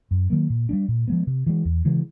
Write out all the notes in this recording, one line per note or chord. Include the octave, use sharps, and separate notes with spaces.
F#2
D#3 F#3 A#3
A#2
G3 A#3 D4
A#2
F3 G#3 B3
C3
E3 G#3
E2
C#3 E3 G#3